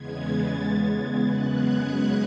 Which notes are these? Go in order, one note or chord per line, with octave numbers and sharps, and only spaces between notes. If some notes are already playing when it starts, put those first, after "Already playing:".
Already playing: E2 C#3 G#3 B3 G#6
A6
G#6
F#2 C#3 G#3 B3 F#6
G#6
G#6